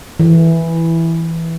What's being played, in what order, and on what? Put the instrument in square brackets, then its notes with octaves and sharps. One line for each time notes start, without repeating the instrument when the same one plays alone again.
[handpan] E3